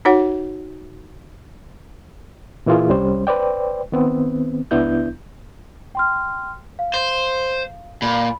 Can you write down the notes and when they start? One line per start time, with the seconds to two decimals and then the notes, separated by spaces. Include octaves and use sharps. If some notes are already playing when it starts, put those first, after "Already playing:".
0.05 D#4 F#4 C#5 F#5
2.66 A#2 E3 A#3 E4 F4 G#4
2.89 C2 G3 C#4 C5
3.27 B4 C5 D5 G5
3.92 D#3 B3 C4
4.71 C#2 B3 D4 E4 G6
5.95 G5 C6 F6
6.79 F5
6.94 C5
8.02 A#2 B5